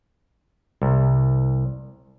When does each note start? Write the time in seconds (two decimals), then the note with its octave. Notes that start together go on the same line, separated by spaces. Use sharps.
0.82 C2